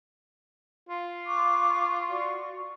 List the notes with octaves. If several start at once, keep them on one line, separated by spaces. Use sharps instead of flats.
F4
C#6 D6 F#6
F#4 D5 C#6